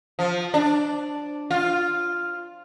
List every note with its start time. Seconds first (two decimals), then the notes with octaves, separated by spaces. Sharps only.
0.19 F3
0.54 D4
1.51 F4